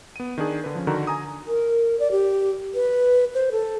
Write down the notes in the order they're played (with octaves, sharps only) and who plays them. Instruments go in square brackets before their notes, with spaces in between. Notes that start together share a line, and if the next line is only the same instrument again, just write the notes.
[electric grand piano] B3 D#7
D#3 D4 G#4
D3 B4
F3 C#4
D3 D#3 F#4 A#4 A#5
G#5 A#5 D#6
[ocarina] A#4
D5
G4
B4
C5
A4